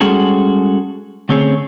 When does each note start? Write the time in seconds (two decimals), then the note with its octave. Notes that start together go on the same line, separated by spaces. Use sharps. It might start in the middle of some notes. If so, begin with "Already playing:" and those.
0.01 G3 G#3 C#4 F#4 G#4 A4
1.29 D3 A3 C4 C#4 G#4 C#5